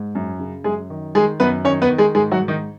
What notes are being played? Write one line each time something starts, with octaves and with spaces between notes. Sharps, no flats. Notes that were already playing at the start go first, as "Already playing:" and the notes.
Already playing: G#2
F#2
C#3
F#2 G#3 G#4
D#3
D#3 G#3 G#4
F#2 B3 B4
D#3 C#4 C#5
B3 B4
D#3
G#3 G#4
G#2 G#3 G#4
F#3 F#4
G#2
D#3 D#4